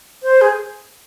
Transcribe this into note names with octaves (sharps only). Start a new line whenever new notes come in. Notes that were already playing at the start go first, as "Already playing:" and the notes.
C5
G#4